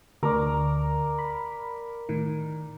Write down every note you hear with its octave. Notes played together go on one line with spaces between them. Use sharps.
D2 A#4 D5
B5
A2 D#3